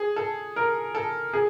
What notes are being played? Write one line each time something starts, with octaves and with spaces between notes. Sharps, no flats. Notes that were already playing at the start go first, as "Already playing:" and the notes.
Already playing: G#4
A4
A#4
A4
G#4